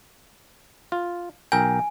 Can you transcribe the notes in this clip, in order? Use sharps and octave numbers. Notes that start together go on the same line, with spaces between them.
F4
B1 A#4 G5 G#5